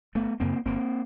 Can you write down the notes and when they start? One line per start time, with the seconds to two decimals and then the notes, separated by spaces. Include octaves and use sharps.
0.15 G1 A3 B3
0.40 F#2 C#3 A#3 C4
0.65 G1 A#3 C4